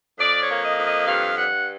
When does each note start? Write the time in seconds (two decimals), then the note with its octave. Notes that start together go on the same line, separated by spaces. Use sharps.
0.19 F2 D5
0.42 C#5
0.48 A#3
0.64 D#5
0.78 F2
0.85 D#5
1.06 G2 F5
1.36 G2 F#5